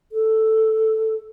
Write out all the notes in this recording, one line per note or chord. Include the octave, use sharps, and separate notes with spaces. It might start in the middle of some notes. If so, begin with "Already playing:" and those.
A4